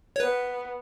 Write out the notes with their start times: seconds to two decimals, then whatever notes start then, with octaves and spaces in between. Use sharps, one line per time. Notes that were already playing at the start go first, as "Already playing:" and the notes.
0.16 C#5
0.20 B3 B4